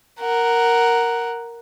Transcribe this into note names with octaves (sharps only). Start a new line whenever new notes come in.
A#4 F#5